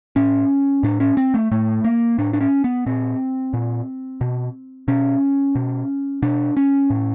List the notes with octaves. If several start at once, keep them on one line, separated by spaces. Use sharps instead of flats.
A2 C#4
A2 D4
C#4
C4
A3
A2 A3
A#3
A2 D4
D4
C#4
B3
A#2 C4
A#2
B2
B2 C#4
B2
B2 D4
C#4
A2